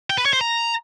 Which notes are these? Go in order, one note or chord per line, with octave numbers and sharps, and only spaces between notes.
G5
B4
C#5
C5
A#5